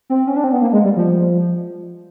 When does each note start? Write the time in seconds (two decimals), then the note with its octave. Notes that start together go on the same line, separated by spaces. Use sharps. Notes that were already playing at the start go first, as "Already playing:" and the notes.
0.10 C4
0.27 C#4
0.36 D4
0.44 C4
0.52 B3
0.62 A#3
0.73 G#3
0.84 G3
0.97 F3